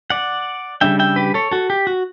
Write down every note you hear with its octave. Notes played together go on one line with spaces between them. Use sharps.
D5 F#5
C#3 G3 D4 E5 G5
E5 G5
G4 B4
A4 C#5
F#4 A4
G4
F#4